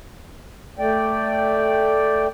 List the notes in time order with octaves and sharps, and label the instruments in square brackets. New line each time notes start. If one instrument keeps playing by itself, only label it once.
[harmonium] A3 D5 G5